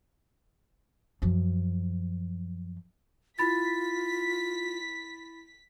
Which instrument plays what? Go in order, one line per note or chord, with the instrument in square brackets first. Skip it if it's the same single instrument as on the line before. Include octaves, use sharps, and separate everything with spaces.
[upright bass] F#2 F3
[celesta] E4 B5 A6 [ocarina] F4 [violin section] B6